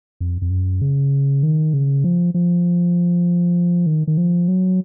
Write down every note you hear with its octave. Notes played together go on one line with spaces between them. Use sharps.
F2
F2
F#2
C#3
D#3
C#3
F3
F3
D#3
D#3
F3
F#3